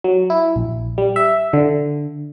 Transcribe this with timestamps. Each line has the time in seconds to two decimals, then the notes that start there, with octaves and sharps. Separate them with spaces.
0.04 F#3
0.30 E4
0.56 A#1
0.98 G3
1.16 E5
1.53 D3